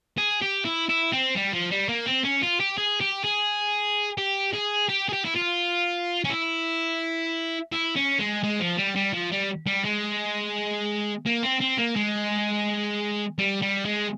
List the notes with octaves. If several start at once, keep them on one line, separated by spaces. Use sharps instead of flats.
G#4
G4
E4
E4
C4
G3
F3
G3
A#3
C4
C#4
F4
G4
G#4
G4
G#4
G4
G#4
G4
G#4
G4
E4
F4
C#4
E4
E4
C#4
G#3
G#3
F3
G3
G3
F3
G3
G3
G#3
A#3
C4
C4
A#3
G#3
G3
G3
G#3